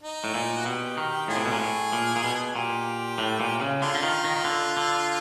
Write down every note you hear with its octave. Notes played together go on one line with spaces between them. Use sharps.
D#4
A2
A#2
F#4
B2 G4
D#3
A2 D#4 F4 G#4
C3
B2
A#2
A2
A#2
A#2
B2
A#2 G4
A2
A#2
C#3
D3 F4
D3
D#3
D#3
D#3
D3
D3